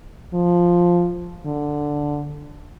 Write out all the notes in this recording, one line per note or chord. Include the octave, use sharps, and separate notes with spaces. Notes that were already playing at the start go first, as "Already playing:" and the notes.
F3
D3